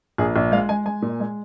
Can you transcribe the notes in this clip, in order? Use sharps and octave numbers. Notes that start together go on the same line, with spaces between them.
A#1 G#4
A#1
G#3 F5
G#3 G#5
G#3 G#5
A#2
G#3